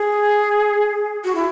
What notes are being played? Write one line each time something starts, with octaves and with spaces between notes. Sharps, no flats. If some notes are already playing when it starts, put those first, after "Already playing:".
Already playing: G#4
F#4
E4